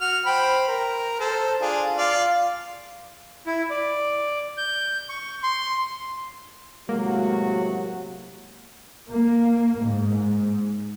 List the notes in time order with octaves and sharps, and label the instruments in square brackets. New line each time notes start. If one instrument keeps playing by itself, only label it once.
[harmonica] F#4 F6
C5 G5 B5
A#4
A4 C5
D4 F4 G#4
F4 D5 F5
[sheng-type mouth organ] E4
D5
G6
C#6
C6
[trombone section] A2 C3 F#3 [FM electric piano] G#3 [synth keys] A#3 [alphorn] F#4
[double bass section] A#3
G#2